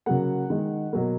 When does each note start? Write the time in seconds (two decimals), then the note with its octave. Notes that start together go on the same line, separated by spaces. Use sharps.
0.06 C#3 F#3 A#3 F#5
0.50 D#3 G#3
0.93 B2 F#3 A#3